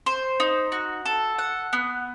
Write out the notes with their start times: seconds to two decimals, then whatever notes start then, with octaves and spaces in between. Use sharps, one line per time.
0.06 C5
0.40 D#4
0.72 F#4
1.05 A4
1.39 F#5
1.73 B3